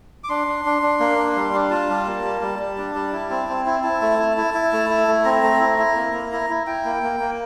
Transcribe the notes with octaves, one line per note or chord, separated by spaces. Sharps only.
D6
D4 C6
D4
D4
D4
A#3
D4
G3
D4
F4 A5
G3
A#3
G3
G3
G3
D4
G3
E4
C4
C4
E4
E4 A5
A3
E4
E4
E4
A3
E4
A3
C4 A#5
A3
E4
E4
A#3
A#3
E4
E4
E4 G5
A#3
A#3
A#3